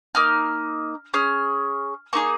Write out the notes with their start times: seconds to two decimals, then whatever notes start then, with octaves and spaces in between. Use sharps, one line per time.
0.15 A#3 D#4 F6
1.13 C#4 G#4 F6
2.13 A#3 D#4 G#4 C#6